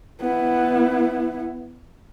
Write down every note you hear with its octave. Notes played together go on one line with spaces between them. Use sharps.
B3 E4